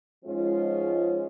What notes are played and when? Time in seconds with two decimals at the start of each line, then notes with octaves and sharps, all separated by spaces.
0.25 G#2 F3 G#3 C#4 F4